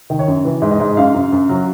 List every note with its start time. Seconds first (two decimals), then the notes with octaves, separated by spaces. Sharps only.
0.10 D#3
0.19 C#5
0.28 F#2
0.45 E3
0.62 G#2
0.71 D#5
0.80 G#2
0.97 F#2 F5
1.14 F#2
1.32 F#2
1.49 F#3